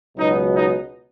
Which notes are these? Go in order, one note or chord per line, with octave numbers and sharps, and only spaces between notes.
C#2 B2 F#3 B3 D#4
D#4